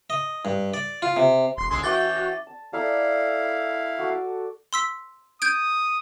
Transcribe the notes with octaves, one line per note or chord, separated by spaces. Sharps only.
D#5
G2
D5
F4
C3
E1 C6
B1 D3 G#3 C6
E3 C#4 F#4 E5 G5 D6 A6
F#4
A5
E4 A4 D5 F5 A#5
F#4 A4 D6
C6 E6 B6
D#6 G6 G#6 D7